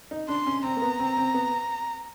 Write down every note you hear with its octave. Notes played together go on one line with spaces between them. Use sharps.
D#4
D4 C6
C#4
C4 A#5
A#3
B3
C4
C4
B3